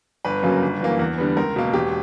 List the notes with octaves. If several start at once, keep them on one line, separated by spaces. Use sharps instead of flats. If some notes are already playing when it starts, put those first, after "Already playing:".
G1 B4
F#2 C#3 F#3 A#3
G1
F#2 E3 A#3
E2
D3 G3 B3
C#2 A#4
B2 A#3
E1 G4